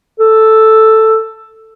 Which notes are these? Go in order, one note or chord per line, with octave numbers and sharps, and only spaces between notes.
A4